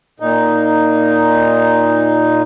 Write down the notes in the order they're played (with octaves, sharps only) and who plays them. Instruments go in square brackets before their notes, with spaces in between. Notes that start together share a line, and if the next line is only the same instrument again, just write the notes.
[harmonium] A#2 D#4